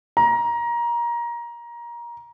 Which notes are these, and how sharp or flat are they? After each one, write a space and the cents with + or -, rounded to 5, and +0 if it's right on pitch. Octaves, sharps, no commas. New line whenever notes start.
A#5 +20